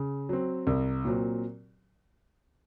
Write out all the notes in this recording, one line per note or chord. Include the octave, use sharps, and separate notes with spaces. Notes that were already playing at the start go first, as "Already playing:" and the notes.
Already playing: C#3
F#3 C4
C2
A#2 F#3 C4